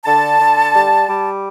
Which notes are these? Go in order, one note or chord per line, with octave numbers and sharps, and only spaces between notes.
D3 A5
D3
G3
G3